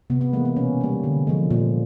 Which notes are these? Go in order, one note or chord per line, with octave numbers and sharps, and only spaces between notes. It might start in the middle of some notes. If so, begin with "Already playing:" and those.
C3 B3
B3
E3 G#3 A#3
B3
B2 C#4
G3 A#3
D3
F3 G#3
A#2